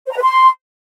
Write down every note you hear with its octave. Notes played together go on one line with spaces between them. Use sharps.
C5
A#5
B4
C6